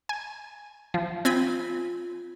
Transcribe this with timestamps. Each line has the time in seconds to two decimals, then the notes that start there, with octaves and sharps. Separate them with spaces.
0.09 G#5
0.94 F3
1.25 C4 F4 G#5 B5